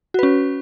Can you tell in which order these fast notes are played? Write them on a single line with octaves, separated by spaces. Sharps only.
F#4 B4 C#4